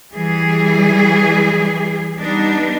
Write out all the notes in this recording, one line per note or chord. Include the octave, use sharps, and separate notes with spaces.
E3 G3 G#4
G3 B3 D4 D#4